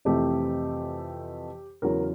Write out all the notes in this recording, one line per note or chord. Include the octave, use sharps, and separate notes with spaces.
F2 C3 E3 A3 C4 G4
E2 C#3 F#3 A#4